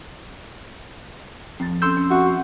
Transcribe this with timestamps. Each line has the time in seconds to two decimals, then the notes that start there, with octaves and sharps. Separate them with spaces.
1.60 F2 C4 A6
1.82 C#4 A4 C6 E6 G6
1.97 C#4
2.10 C4 F#4 E5
2.28 C4